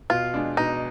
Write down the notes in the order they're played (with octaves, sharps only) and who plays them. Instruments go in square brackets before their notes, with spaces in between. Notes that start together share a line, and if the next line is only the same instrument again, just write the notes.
[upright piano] B2 [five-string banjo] F4
[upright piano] G#3 D4
[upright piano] B2 [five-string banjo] D#4